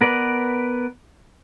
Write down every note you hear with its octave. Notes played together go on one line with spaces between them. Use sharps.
B3 A#4 B4 D5